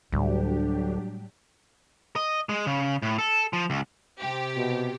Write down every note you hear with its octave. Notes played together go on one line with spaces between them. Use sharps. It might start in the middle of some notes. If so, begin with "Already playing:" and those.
D2 A2 F#3 G3 D4 G4
D#5
G#3
C#3
A2
A4
F3
C#2
C3 G4
B2